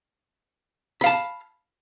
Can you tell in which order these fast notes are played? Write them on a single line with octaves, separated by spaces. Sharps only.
B5 F5 A5